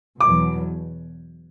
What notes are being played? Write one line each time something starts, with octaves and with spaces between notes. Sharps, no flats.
E2 B2 F#3 D6